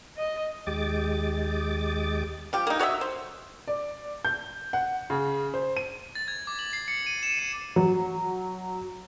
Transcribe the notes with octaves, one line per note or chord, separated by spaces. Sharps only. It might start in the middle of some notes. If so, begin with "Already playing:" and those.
D#5
D#2 G#3 G4 D#5 D6 A6
F3 G4
A#3 D#4
F#4 C#5 D#5 E5
C5
D5
G6
F#5
C#3
C5
D#7
A6
G#6
D6
F#7
C7
C#7
D#7
E7
C#7
F#3